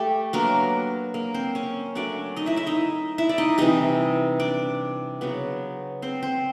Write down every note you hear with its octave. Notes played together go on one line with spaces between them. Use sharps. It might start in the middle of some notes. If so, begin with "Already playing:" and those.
Already playing: A3 G4 A4
F#3 A#3 B3 D4 A#4
A#3 A#4
C4 C5
C#4 C#5
F#3 A3 C#4 D4 D5
D#4 D#5
E4 E5
E4 E5
D#4 D#5
E4 E5
D5
D#4 D#5
C3 E3 G3 D#4 D#5
D4 D5
C#3 F#3 B3
C4 C5
C4 C5